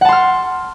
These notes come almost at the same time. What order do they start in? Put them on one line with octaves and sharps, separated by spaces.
F#5 A5 C6 F6